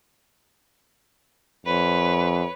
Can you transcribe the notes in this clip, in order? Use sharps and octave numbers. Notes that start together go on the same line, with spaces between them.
F2 B4 C#5